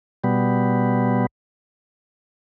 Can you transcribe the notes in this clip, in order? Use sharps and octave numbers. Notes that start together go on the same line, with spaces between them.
B2 G3 B3